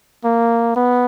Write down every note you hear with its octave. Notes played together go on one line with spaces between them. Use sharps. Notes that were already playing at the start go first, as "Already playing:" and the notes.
A#3
B3